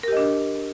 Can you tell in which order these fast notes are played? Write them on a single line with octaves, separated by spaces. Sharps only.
A#4 G4 D#5 D4